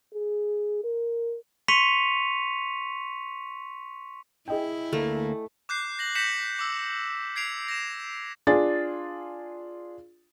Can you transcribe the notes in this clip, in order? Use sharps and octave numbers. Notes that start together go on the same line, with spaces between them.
G#4
A#4
C6 C#6 B6 C#7 D#7 F7
E4 G#4 D#5 G5
D2 A3 A#3
D6 F#6 G6 C7
A#6 F#7
G6 A#6 B6 C#7 E7 F#7
D6 E6
G#6 C7 D7 F7
A#6 E7
D4 F4 G#4 A6